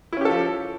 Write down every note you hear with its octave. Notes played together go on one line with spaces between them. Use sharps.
F3 C#4 E4 G4 A4